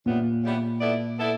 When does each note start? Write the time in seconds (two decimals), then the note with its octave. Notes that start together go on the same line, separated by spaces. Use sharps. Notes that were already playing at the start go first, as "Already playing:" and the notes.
0.06 A#2 C#3 E3 G3 B3
0.43 C#3 E3 G3 B3
0.80 B3 E4 A4 D5
1.17 B3 E4 A4 D5